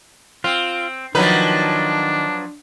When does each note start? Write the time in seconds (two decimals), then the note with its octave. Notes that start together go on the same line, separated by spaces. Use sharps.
0.44 C4 F4
1.15 D#3 F3 F#3 D4 B4